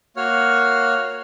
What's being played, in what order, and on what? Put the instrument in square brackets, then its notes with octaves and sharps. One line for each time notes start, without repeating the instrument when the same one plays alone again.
[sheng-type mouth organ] A#3 F#4 C#5 F6